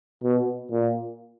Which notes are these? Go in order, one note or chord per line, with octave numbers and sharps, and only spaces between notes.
B2
A#2